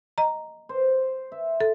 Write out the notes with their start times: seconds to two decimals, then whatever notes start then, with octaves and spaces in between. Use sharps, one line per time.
0.18 D#5 A#5
0.69 C5
1.32 E5
1.61 A4